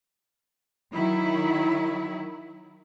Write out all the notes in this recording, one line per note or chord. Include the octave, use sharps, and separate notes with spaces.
D#3 F#3 E4